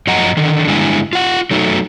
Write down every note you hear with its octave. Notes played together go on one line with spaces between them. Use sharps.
F#2 F3 D#5 F#5 A#5
D3 D#3
G2 D3 G#3 D4 E4 G#5
F4 F#5
F#3 A3 D#4